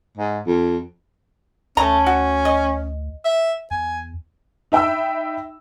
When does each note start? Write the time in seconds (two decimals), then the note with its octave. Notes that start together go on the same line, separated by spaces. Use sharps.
0.18 G#2
0.46 F2
1.77 D2 A3 C#4 A#5
2.06 F#4
2.45 D#5
3.25 E5
3.71 E2 G#5
4.72 D#4 E5 G5 B5 E6